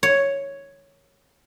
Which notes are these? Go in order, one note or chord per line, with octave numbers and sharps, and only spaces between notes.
C#5